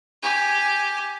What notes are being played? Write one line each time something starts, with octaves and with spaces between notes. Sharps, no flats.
G4 G#5